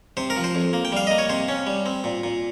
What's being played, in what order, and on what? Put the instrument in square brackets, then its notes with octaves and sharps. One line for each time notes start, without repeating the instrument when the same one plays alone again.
[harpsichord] C3 C5
A#4
F3
C5
F2
A#3
G5
G3 F5
A#3 D#5
C#5
C3 C5
C#4
G3
C4
A#2
A#2